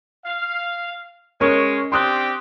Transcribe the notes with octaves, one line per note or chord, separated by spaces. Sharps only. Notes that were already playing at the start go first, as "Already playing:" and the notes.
F5
G#3 C#4 A#4 C#5 C#6
C4 D4 G4 C6 D#6 F#6